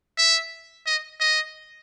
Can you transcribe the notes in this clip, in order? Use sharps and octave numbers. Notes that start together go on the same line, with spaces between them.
E5
D#5
D#5